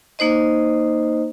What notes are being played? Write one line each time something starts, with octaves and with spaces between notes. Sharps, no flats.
A#3 D#4 C5 D#5